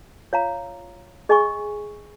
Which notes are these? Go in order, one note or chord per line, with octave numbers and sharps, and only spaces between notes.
F4 C#5 F5 A#5
G#4 D#5 G#5 C#6